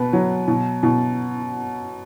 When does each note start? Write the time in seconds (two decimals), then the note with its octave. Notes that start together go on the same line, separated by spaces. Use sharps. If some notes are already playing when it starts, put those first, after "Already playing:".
Already playing: B2 B4
0.13 F#3
0.48 B2
0.83 B2